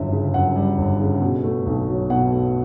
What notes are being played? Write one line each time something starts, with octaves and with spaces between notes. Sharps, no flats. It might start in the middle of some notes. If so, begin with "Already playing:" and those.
Already playing: G1 F#2 G3 E5
C#3
F#2 F#5
G3
G1
C#3
B2
A3
B1
F#3
B2 F#5
A3